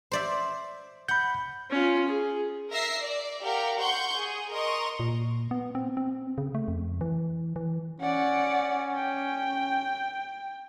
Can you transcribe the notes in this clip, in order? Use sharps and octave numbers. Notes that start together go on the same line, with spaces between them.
C5 D5 E5
F#5 B5 G6
C#4 F4
G#4
A#4 E5 A#6 C7
D5
G4 A#4 F5 F#5
F#5 C6 C#6 G6
G#4
A#4 D#5 A#5 C6 C#6
A#2
B3
C4
C4
C#3
A3
F2
E3
E3
C#4 D5 F#5
G5